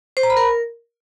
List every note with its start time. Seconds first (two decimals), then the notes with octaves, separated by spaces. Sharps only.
0.17 C5
0.23 A#5
0.30 B5
0.37 A#4